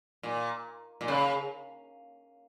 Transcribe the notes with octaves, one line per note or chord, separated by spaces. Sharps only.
A#2
A#2
C#3